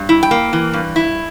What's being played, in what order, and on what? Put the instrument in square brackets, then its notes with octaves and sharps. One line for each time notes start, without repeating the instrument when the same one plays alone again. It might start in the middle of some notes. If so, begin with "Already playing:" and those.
Already playing: [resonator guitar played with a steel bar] G2
E4
G5
A#3
E3
G2
E4